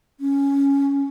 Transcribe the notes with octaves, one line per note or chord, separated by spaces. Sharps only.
C#4